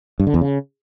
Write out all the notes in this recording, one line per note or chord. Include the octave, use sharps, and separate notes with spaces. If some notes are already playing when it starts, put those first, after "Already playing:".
G2
D3
E2
C#3